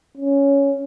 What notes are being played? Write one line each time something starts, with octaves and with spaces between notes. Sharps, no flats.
C#4